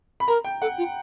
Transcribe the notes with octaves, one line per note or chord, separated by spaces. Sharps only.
B5
A#4 A#5
G5
A4 F#5
F4